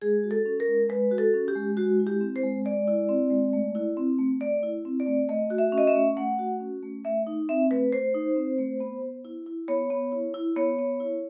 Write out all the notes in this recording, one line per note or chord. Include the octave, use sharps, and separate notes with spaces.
G#3 G#4
F#4
A4
C#4
A#4
G#3
G#3 B4
F#4
A4
C#4
G4
G#3
G#3 F#4
E4
G4
C4
C5
G#3
G#3 D5
E4
C4
G#3
A3
E4
C4
A3
A3 D5
E4
C4
D5
A3
A3 D#5
F#4
E5
C#4
D#5
E5
A3
A3 F#5
F#4
C#4
A3
A3 E5
D#4
C4 E5
A3 B4
A3 C5
D#4
C4
A3
B3
B3
E4
E4
B3 C#5
B3
E4
E4
B3 C#5
B3
E4